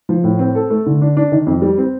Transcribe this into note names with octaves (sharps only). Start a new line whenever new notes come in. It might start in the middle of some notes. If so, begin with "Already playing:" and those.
F3
A2
C4
A4
A3
D3
D4
D4
D#3
F2
G3
C4